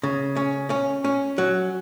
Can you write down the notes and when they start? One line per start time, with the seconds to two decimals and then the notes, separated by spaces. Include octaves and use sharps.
0.03 C#3
0.36 C#4
0.70 C#4
1.05 C#4
1.38 F#3